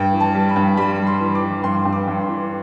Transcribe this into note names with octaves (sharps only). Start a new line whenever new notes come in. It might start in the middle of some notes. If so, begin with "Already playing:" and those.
Already playing: G2 G5
E3
A5
G3
B5
G2
G3 B5
G3
C6
E3
D6
E3
G2 C6
G2
D6
G2
C6
E3